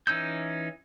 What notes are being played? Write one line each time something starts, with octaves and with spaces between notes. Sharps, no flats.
E3 C#4 D#4 E6 G6